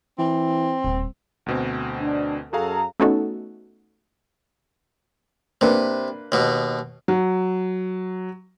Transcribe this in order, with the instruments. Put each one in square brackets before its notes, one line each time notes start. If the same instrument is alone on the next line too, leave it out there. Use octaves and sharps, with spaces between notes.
[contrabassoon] E3 [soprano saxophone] C4
[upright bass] D#1
[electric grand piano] D2 B2 C4
[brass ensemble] D4
[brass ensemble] F#2 A4 A#5 [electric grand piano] F#4 G#4 F5
[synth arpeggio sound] A3 B3 C#4 D#4 F#4 A4
[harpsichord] C3 [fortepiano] A#3 D4 B4
[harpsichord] D#2 B2
[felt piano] F#3